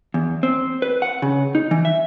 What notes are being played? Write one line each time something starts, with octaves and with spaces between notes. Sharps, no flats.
E2
C4
B4
F#5
C#3
D#4
E3
E5